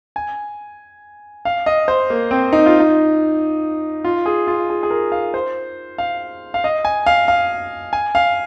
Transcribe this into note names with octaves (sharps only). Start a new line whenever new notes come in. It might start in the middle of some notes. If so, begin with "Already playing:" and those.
G#5
F5
D#5
C5
A#3
C4
D#4
F4
D#4
F4
G#4
F4
G#4
G#4
A#4
F5
C5
F5
F5
D#5
G#5
F5
F5
G#5
F5